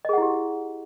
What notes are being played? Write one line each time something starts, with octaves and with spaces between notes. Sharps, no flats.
E4 G4 G#4 D#5 F#5